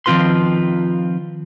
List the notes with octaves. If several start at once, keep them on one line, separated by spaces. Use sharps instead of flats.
D#3 F3 C4 F4 B4 C6